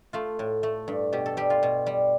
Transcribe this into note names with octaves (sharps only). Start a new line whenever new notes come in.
A3 F4
A2
A3
G2
B2 G4
A4
G3 G4
F4
B2
G3